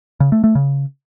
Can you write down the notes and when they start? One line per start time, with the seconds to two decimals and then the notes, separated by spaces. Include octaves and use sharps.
0.20 C#3
0.32 A3
0.44 A3
0.55 C#3